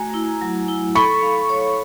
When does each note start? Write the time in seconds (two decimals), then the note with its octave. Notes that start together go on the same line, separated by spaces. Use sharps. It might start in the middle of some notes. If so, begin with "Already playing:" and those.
Already playing: A3 F#4 G#5 A#5
0.14 E4
0.41 F#3
0.68 E4
0.95 A4 B5 C#6
1.22 F5
1.49 C#5